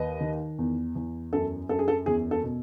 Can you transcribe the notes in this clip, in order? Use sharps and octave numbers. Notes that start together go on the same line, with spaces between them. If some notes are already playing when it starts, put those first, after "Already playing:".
Already playing: D#2 B4 D#5
D#3
E2
E2
F#2 A4
F#2 A4
G#4
A4
E2 G#4
A4
B2